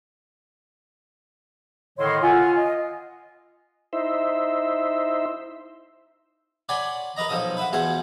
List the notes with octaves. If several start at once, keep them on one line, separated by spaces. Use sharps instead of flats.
A2 D3 D#3 C#5 D#5 C6
F4 F#5 G#5
D#5
D#4 E4 C5 E5
C#5 D5 F#5 G#5 B5 C6
A#4 B4 D#5 A#5
B1 F3 A4 D#5 D#6
B4 E5 F#5
E2 B2 A3 F4 F#5 G#5